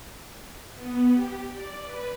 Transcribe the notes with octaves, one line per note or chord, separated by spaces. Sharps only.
B3
G4
D5
B4